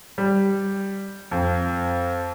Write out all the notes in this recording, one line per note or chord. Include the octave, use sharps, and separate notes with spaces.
G3
F2